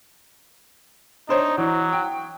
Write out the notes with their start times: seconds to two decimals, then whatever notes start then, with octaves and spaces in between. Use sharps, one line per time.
1.29 D4 D#4 C5 C#5
1.58 E3 F#3
1.93 G5